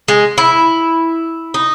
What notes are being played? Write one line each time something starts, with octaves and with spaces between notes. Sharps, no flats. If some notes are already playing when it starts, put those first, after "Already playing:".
G#3
E4
D#4